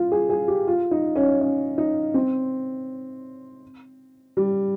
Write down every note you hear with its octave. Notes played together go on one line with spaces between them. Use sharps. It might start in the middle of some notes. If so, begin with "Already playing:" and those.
Already playing: F4
G#4
G#4
G4
F4
D#4
C#4
C#4
D#4
C4
G3